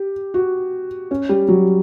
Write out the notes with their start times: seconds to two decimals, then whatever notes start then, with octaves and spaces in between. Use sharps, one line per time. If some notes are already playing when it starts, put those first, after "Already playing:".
Already playing: G4
0.34 F#4
1.11 C#4
1.29 G3
1.49 F#3